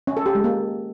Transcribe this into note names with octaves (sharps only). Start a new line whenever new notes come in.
C#4
A4
G4
G#3
A#3